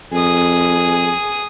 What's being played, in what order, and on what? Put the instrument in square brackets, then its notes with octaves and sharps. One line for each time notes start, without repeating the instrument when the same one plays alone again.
[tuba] F2 [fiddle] G#4 D#6